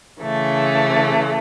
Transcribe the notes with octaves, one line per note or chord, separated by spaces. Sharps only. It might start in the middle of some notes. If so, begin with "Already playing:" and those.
C#3 E3 A3